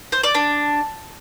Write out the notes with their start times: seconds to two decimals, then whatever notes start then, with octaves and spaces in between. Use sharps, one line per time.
0.12 C5
0.23 D5
0.35 D4